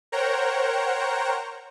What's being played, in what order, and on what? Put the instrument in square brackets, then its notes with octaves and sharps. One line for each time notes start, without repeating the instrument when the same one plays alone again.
[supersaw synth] A#4 C5 C#5 F#5 G5 A#5